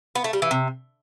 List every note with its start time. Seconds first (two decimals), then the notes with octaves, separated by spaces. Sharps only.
0.15 B3
0.24 A3
0.33 G3
0.42 E3
0.51 C3